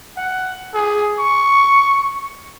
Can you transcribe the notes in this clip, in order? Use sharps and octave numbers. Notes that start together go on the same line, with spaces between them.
F#5
G#4
C#6